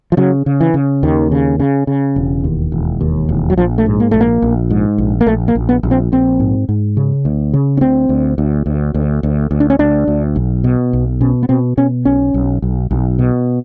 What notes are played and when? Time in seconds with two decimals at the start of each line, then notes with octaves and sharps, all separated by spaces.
0.12 F3
0.17 C#3 F#3
0.46 C#3
0.61 E3
0.74 C#3
1.03 D#2 D#3
1.32 C#3
1.60 C#3
1.87 C#3
2.16 E1
2.44 D#2
2.72 E1
3.01 D#2
3.29 E1
3.50 F#3
3.57 A#1 F3
3.78 A3
3.86 G#2
4.00 A#3
4.11 A#1 A3
4.21 A#3
4.42 A#1
4.70 G#2
4.98 A#1
5.21 A#3
5.26 A#1 A3
5.48 A#3
5.55 A#1
5.69 B3
5.83 A#1
5.91 C4
6.12 A#1 C4
6.40 G#2
6.69 G#2
6.97 C#3
7.25 D2
7.53 C#3
7.77 C#4
7.81 D2 C4
8.09 D2
8.38 D2
8.66 D2
8.94 D2
9.23 D2
9.51 D2
9.60 D4
9.70 C#4
9.79 D2 D4
10.08 D2
10.36 B1
10.64 B2
10.93 B1
11.21 B2 C#4
11.43 B3
11.49 B2 C4
11.77 B2 C#4
12.05 B1 C#4
12.34 B1
12.62 B1
12.91 B1
13.19 B2